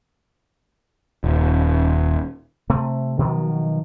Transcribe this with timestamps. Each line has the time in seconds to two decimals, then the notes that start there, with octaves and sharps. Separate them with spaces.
1.24 D#1
2.70 C3 A3 C4
3.19 B2 D#3 F3 F#3